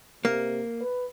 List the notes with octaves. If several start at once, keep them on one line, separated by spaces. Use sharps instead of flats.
C3 A#3
B4